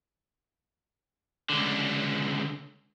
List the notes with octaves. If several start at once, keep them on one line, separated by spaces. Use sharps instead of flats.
C#2 D3